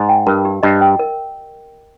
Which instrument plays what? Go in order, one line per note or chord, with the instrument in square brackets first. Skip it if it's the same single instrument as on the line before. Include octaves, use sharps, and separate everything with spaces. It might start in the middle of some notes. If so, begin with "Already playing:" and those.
Already playing: [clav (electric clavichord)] G#2 [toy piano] D#5
[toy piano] G5
[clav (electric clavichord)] G2 [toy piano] A#4
[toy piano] G4
[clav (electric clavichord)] G2 [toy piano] D#5
[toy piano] G5
A#4